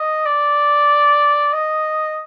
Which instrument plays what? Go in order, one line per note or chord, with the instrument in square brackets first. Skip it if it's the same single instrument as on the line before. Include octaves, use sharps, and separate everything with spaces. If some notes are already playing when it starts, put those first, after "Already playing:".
Already playing: [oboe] D#5
D5
D#5